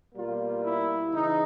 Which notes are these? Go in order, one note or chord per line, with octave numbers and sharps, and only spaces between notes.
B2 G3 A#3 F4
E4
C#3 E3 D#4